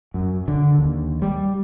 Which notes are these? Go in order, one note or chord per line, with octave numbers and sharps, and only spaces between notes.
F#2
D3
D#2
G3